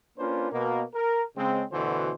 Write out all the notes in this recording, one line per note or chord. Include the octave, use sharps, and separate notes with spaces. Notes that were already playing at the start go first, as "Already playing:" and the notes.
A#3 C#4 D4 F4 B4 C5
B2 A#3
A#4
C#3 G#3 C4
D2 B2 D3 E3 F#4 C5